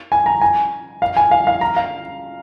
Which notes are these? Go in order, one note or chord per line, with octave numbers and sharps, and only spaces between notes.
G#5
A#5
G#5
F5
G#5
F5
F5
A#5
F5